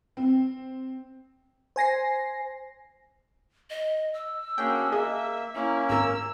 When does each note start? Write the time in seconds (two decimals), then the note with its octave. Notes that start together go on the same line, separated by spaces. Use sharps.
0.17 C4
1.76 C5 G#5 A#6 C7
3.70 D#5
4.14 E6
4.58 A#3 C#4 D4 F#4 G#4 G5
4.92 A#3 G#4 D#5 E5
5.55 A#3 C#4 E4 A#5
5.89 G#1 A#4 A#5 E6